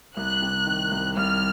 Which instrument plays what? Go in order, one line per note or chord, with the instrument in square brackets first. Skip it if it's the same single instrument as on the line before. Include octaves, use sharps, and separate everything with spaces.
[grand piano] C2 [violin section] F#6
[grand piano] C3
D#3
C2
[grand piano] C2 [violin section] F6